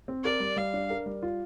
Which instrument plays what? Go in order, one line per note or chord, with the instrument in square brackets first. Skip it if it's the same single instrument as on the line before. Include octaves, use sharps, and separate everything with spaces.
[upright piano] C4
[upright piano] A#4 [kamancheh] D5
[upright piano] G3
[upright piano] G3 [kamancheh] F5
[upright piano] D4
A#4
G3
F4